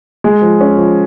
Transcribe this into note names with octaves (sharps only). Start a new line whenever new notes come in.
G#3
F3
C#4
F3